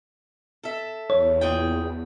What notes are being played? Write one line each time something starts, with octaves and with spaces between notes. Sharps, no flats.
A4 E5
E2 C#5
A#2 G#4 G5